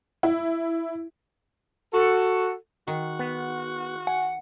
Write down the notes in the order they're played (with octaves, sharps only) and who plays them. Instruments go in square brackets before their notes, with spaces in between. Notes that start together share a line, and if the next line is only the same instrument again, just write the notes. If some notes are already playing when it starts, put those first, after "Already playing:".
[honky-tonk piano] E4
[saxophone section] F#4 A4
[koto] D#3 [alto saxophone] F#4
[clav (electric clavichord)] B3
[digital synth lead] F#5 [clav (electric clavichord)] G#5